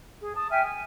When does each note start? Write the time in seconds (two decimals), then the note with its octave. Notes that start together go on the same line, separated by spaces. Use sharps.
0.21 G#4
0.35 A5 D#6
0.50 E5 G5 G#5 F6
0.63 G#5